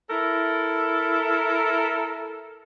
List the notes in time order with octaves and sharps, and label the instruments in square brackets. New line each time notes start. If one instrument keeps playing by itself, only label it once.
[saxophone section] E4 A4 A#4